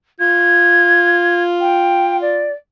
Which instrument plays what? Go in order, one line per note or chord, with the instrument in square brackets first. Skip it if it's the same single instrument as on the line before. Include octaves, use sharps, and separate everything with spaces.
[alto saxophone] F4 [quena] G#6
[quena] G5
D5